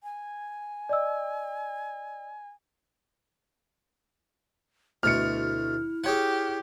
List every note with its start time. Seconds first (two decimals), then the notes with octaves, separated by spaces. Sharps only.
0.03 G#5
0.89 D5 D#5 E6
5.03 D2 B2 A3 E4 F6 C#7
6.04 G4 G#4 C#5 F#5